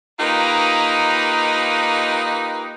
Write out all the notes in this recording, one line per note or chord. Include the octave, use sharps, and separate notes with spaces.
A#3 D#4 F4 G4 B4 D#5